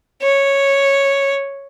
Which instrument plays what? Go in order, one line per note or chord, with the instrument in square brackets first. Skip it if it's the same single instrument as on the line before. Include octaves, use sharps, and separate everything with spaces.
[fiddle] C#5